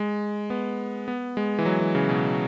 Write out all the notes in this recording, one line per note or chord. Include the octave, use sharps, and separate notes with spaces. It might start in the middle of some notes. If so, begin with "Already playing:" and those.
Already playing: G#3
B3
B3
G#3
E3
F#3
E3
C#3
B2